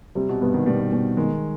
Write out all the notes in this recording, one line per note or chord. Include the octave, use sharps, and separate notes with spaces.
C3 G3
B2
G2 B3
D#3
B2 G3
B2
D#3 G#3